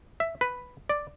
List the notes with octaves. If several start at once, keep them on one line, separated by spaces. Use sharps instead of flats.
E5
B4
D5